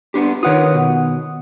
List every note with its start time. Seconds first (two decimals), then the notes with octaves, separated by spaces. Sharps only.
0.14 B3 D4 G4
0.43 D#3 F4 B4 C#5 F#5 D#6
0.74 B2